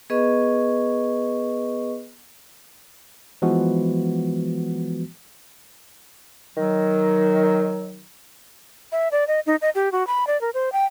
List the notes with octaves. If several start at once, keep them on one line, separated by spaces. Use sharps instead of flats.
B3 G#4 B4 D#5 C#6
E3 F3 G#3 B3 F#4
D#3 F#3
E5
D5
D#5
D#4
D#5
G4
F#4
B5
D5
A#4
C5
G5